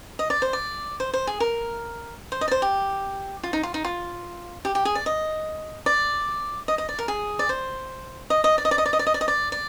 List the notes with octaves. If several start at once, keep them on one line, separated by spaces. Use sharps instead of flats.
D#5
D5
C5
D5
C5
C5
G#4
A#4
C5
D#5
D5
C5
G4
F4
D#4
F4
D#4
F4
G4
G4
G#4
D5
D#5
D5
D#5
D#5
D5
A#4
G#4
D5
C5
D#5
D#5
D5
D#5
D5
D#5
D5
D#5
D5
D#5
D5
D#5
D5
D5